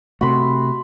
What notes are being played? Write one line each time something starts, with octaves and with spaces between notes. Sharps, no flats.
C3 A3 F#4 B5 C6